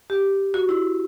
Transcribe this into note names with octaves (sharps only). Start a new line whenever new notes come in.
G4
F#4
E4